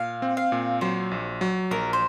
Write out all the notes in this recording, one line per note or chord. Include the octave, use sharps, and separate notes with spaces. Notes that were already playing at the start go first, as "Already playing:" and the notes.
Already playing: A#2 F5
C4
F5
A#2
F#3 C5
A#1
F#3
A#1 A#4
C5